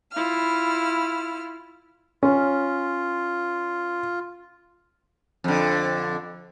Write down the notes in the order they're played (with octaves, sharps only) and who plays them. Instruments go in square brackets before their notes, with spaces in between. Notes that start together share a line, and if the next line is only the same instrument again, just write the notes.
[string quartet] E4 F4 F6
[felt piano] C#4 [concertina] F4
[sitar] F2 D3